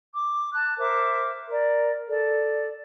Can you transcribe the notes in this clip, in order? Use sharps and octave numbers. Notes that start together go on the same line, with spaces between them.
D6
A5 F#6
A#4 C5 E5 D6
A#4 D5
A4 D5